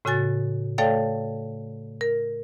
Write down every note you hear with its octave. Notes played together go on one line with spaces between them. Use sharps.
A2 C#3 F#4 G#5 A6
A3 A4 C#5 D5 F5 G5
A#4